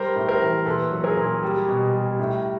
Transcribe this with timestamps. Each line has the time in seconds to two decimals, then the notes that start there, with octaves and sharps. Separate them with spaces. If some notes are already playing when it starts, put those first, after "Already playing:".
Already playing: G3 A#4 C5
0.16 A2
0.28 A#4 C5
0.41 E3
0.66 A#2 A4 B4
0.91 F#3
1.04 G#4 A#4
1.17 A#2
1.43 G3
1.69 B2
1.94 G3
2.19 A2